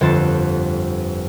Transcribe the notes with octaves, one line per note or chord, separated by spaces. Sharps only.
G1 F2 F4 A6 E7